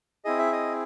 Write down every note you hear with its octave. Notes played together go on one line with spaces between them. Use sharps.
C4 E4 G#4 D#5
E5
D#5